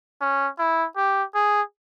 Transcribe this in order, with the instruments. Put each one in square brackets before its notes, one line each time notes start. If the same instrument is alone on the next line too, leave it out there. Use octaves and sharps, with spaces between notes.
[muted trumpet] C#4
E4
G4
G#4